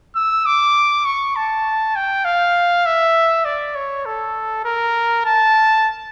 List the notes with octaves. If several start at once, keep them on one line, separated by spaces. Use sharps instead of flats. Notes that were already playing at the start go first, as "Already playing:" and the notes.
E6
D6
C#6
A5
G5
F5
E5
D5
C#5
A4
A#4
A5